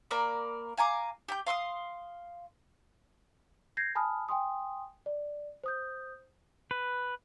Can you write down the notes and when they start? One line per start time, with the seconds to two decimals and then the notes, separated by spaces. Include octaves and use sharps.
0.11 A#3 A#4 D5 B5
0.77 F5 G#5 A#5 D6
1.28 G4 G5 G6
1.47 F5 C6 D6 D#6
3.77 G6 G#6 A#6 C7
3.95 G#5 A5 B5 D#6 F6
4.29 G5 G#5 C6 D#6
5.06 D5
5.64 C5 D#6 G6
6.71 B4